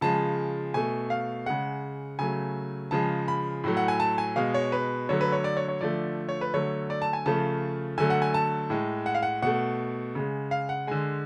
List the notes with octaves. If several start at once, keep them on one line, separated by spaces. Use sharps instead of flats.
C#3 F3 G#3 A5
B2 A3 G#5
F5
C#3 G#3 F#5
C#3 F#3 A3 G#5
C#3 F3 G#3 A5
B5
A2 F#3 A3
F#5
G#5
A5
G#5
B2 G#3 F5
C#5
B4
D3 F#3 A3 C#5
B4
C#5
D5
C#5
C#5
D3 F3 A3 D5
C#5
B4
D3 F#3 A3 C#5
D5
A5
G#5
C#3 F3 A3 A5
D3 F#3 A3 G#5
F#5
G#5
A5
A2 G#3
F#5
F5
F#5
B2 A3 F#5
C#3 G#3
F5
F#5
D3 G#3 G#5